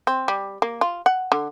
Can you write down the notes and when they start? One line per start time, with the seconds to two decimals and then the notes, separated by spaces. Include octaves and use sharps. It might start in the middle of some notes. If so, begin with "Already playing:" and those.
0.07 C4
0.28 G3
0.62 A#3
0.81 F4
1.06 F#5
1.32 D3